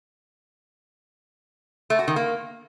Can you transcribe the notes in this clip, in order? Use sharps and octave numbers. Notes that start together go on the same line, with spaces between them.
A3
F#4
D#3
A#3